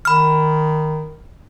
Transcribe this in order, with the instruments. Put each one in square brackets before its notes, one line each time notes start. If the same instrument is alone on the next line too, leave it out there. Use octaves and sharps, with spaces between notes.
[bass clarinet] D#3 [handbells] B5 F6